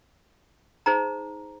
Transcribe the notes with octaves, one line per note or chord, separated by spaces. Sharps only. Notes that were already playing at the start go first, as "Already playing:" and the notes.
D#4 G#4 C5 A#5